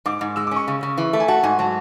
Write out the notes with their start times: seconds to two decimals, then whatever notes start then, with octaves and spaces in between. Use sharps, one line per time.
0.06 G#2 D6
0.21 G#2
0.36 G#3 E6
0.47 D6
0.51 C#4 C#6
0.68 C#3
0.83 C#3
0.98 E3
1.13 A3
1.20 G#5
1.28 F#4 A5
1.43 G#2 G#5
1.59 F#3 A5